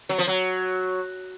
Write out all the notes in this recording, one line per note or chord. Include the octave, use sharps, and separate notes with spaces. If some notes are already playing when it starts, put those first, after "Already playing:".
F#3
F3
F#3